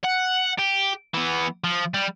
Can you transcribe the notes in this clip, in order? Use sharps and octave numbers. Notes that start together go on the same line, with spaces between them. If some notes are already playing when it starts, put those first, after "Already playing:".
F#5
G4
E3 B3
F3
G3